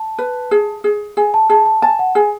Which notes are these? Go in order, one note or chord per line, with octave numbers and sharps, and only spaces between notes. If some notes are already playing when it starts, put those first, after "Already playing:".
Already playing: A5
B4
G#4
G#4
G#4 G#5
A5
G#4 A5
A5
G#5 A5
F#5
G#4 G#5